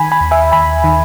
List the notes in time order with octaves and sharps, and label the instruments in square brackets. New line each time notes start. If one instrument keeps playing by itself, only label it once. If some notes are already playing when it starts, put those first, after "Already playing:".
Already playing: [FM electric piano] D#3 G#5 B5
G#5 B5
D#2
E5 G#5
D#2 G#5 B5
D#3